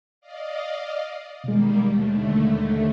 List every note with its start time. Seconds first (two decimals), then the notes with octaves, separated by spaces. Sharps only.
0.21 D5 D#5 F5
1.44 B2 D#3 G3 G#3 A#3
1.85 D#2 D3 A3